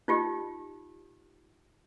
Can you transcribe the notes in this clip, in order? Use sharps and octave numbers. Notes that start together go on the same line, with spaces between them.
D#4 F4 G4